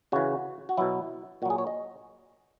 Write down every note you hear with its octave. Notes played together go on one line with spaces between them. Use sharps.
C#3 E3 F#4
F#4
B2 F#3 E4
A#2 F#3 F#4 G#4
C#5
D#5